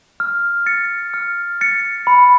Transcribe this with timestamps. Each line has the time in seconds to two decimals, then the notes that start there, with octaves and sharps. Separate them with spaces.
0.20 F6
0.66 A6 C#7
1.14 F6
1.61 A6 C#7
2.07 B5